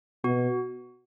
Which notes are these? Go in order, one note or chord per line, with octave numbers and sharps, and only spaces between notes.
B2 F#4